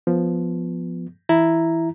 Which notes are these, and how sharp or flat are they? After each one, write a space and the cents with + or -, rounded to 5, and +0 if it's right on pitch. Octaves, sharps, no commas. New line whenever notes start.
F3 +0 B3 +0
E3 +0 E4 +0 A#5 +0